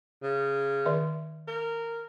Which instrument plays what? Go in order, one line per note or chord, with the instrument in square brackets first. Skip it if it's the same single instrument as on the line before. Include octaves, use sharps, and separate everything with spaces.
[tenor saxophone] C#3
[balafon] D#3 D5 E5
[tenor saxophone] A#4